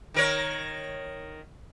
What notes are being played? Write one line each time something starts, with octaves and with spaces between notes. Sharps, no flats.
D#3 A#4 C#5